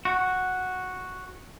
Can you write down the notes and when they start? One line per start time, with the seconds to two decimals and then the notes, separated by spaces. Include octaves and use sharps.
0.05 F#4